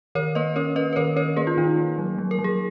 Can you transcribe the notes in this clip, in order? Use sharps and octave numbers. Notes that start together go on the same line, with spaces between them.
D#3 A#4 C#5
A#3 B4 D#5
C#4 A#4 C#5
C#4 B4 D#5
B4
D#3 A#4 C#5
C#4 A#4 C#5
A#3 G#4 B4
F4
D#3 D#4
A#3
F#3
F#3
A#4
F#3
G#4